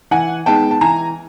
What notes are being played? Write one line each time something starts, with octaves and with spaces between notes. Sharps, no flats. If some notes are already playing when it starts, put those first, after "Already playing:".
E3 F#5 G#5
G#3 B3 D#4 G5 A5
A5
E3 G#5 A#5